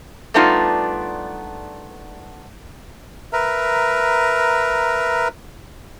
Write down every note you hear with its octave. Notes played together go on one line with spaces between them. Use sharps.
G3 A3 B3 D4 D#4 F4
A#4 B4 E5 A#5